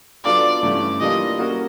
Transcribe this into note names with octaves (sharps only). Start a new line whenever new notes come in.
F#3 B3 D4 F4 A4 D5
G2 E3 A3 C#4
E3 G3 A#3 D4 F4 D#5
G3 A#3 C#4 F#4 A#4